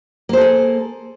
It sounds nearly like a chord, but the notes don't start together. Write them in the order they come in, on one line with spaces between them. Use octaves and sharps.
A#3 C5 A4 G#4